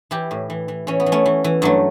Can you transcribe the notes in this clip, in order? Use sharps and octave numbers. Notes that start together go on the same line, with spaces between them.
E3 E4 G4
A2
E3
E3
E3 C#4
B3
E3
A3 C#4
E3
E3
G2 F#3 A3